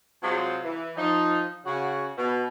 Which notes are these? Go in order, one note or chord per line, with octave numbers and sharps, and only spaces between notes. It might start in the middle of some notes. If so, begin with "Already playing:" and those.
C3 F#3 G#3 F4 F#4 C5
E3
F3 D#4
C#3 F#4
B2